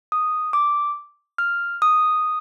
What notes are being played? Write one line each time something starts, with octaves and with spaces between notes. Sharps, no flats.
D#6
D6
F6
D#6